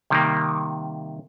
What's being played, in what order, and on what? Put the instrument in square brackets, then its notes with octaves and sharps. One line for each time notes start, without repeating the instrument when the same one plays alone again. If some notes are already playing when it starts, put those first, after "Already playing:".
[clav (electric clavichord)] C3 D#3 G3 A#3